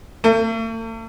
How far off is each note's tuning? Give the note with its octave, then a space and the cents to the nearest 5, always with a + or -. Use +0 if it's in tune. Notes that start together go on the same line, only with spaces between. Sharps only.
A3 +45